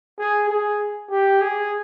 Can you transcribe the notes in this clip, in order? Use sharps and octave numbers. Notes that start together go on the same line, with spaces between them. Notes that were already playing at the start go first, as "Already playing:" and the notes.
G#4
G#4
G4
G#4